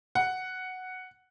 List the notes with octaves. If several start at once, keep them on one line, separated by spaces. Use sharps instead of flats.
F#5